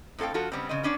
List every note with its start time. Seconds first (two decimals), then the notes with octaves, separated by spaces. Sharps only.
0.18 A2 C4 A4 F5 G5
0.34 F3 F4 F#4 A4
0.52 C#3 G3 B3 C4
0.69 C#3 C4 D#5
0.83 B3 C#4 D4 D5